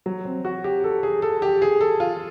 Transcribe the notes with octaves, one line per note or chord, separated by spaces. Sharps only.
F#3
C4
F#4
G4
A4
G#4
A4
G4
G#4
A4
F4